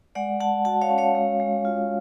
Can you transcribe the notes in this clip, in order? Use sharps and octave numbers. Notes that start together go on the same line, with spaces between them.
G#3 D5 F#5
G#3 F#5 A5
F#4 F#5 A5
C#5 F5
C#4
C#5 F5
G#3
G#3
F4